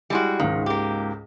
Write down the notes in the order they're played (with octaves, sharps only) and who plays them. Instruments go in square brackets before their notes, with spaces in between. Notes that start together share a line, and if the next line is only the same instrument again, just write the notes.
[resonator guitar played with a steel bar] G3 G#3 F#4 [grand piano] E4
[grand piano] C#2 G#2 [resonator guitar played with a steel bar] D#3
[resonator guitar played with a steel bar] A#3 G4